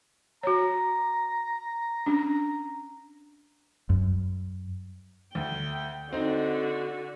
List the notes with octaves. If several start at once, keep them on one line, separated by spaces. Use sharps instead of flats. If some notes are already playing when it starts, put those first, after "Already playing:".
F#4 C#5 A#5
C#4 D4
F#2
D2 G5
D3 C4 D#4 F#4